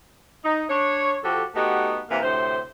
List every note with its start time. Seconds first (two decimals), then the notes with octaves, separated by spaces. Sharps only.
0.44 D#4
0.69 D4 C#5
1.23 F3 F#4 G4 A4
1.55 A3 B3 D#4 F#4 G4
2.09 C3 E3 A#3
2.22 D2 A2 C3 C5